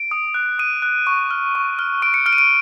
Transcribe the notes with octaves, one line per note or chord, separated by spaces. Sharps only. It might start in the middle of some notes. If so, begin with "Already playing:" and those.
Already playing: D7
D#6
F#6
D#6 D#7
F#6
C#6
F6
C#6
F6
C#6 D7
C#7
F6 D7
D#7
D7